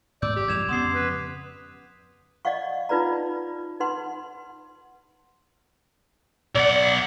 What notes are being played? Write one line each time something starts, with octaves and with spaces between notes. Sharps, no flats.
G#2 D5 D6 E6 G6
G4
G2 F3 G#3 G#6 E7 F7
F2 C#3 B3 C6 D#6 C7
B4
D5 D#5 F5 F#5 C#6
D#4 F4 B4 D5 A#5
D#4 B4 F#5 C6
B1 D5 F#5